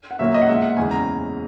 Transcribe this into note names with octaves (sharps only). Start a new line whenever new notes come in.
F#5
A#2 F#3 A#3 E5
D#5
F#5
A#2 G#3 E5
F#5
E2 C#3 E3 G#3 G#5
A#5